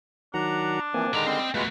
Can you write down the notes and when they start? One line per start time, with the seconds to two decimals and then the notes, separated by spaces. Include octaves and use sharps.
0.34 D#3 F#3 D4 F#5 A#5
0.94 E3 F3 A#3 C4 G#5
1.14 D3 D#3 G#3 E4 A#5 D6
1.27 G3 C4 D#5
1.55 G#3 A3 B3 F4 F#4 B4